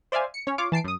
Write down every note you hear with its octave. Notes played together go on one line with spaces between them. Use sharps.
C5 D5 E5 F5 G#5
C#7
C#4 C#5
F4 C#5 F5 D6
E3 A5 C7 D7
F#2 D#6